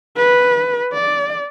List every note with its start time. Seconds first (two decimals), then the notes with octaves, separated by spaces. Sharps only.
0.17 B4
0.93 D5